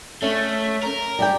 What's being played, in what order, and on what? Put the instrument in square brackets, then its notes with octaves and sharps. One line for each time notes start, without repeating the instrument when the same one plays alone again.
[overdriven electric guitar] A3 [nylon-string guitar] C#4
[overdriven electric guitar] A#4
[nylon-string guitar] G3 G4 G5